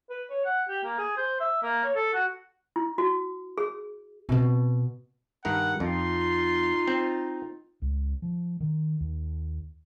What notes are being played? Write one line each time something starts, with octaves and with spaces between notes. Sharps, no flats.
B4
C#5
F#5
G4
A#3
G#4
C5
E5
A#3
C#5
A4
F#4
E4
F#4
G#4
B2 C4
G2 D#3 A#4 F#5
F2 D#4 F4 C6
C4
C#2
F3
D#3
D#2